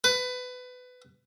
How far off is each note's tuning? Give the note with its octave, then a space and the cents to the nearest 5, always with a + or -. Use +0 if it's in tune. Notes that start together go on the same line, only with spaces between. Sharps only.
B4 +20